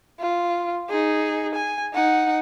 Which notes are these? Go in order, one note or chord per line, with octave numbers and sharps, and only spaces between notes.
F4
D#4 G#4
G#5
D#4 F#5